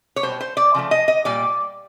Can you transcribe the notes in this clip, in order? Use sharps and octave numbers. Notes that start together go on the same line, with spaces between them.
C#5
B2 G3 C5
C5
D5
C#3 F3 A3
D#5
D#5
A#2 G3 D5